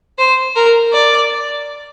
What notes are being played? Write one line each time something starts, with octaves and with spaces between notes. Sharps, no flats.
C5
A#4
D5